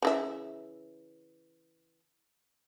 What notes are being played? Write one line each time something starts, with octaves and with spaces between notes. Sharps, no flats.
C#3 E3 E5